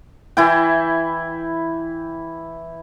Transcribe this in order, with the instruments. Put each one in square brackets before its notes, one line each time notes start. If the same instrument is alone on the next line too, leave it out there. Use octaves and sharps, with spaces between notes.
[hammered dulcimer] E3 E4 G5